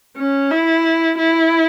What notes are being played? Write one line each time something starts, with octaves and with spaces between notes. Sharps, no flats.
C#4
E4
E4